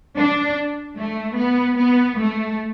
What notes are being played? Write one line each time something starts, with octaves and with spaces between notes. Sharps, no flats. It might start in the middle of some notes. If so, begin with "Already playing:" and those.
D4
A3
B3
B3
A3